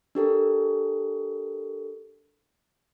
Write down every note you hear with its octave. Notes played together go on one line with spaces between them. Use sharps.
D4 G4 A4 A#4